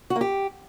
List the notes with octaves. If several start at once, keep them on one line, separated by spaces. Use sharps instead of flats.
F#4
A#3
G4